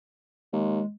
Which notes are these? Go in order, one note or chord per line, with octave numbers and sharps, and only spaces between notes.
D#2 G#3